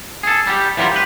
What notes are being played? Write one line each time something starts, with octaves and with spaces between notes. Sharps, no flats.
G#4 A4
G3 G4
E3 F#3 G3 F4 A#4
G4 B4